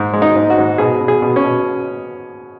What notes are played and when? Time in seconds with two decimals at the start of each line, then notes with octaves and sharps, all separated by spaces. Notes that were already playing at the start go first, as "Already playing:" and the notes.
Already playing: G#2
0.13 G#3
0.22 D#4
0.36 G#2
0.50 F#4
0.58 G#2
0.78 B2 G#4
1.00 B2
1.08 G#4
1.22 B2
1.36 C#4
1.44 B2